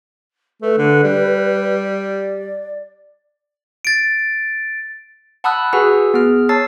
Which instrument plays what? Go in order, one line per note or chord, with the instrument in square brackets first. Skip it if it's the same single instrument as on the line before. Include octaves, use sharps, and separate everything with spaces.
[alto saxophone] A3 [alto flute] B4
[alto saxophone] D3
G3
[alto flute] D5
[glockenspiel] A6 D7
[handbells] F#5 A5 B5 D#6 E6 F#6
F#4 G#4 B4 F#5 G#5 E6
B3 G#4 F6
C#5 A5 E6 A6 C7